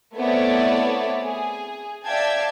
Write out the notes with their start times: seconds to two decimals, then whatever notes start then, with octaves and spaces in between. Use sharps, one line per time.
0.16 A3 B3 C4 E4 C#5 D5
1.24 G#4
2.05 D5 E5 F5 G5 A5 G#6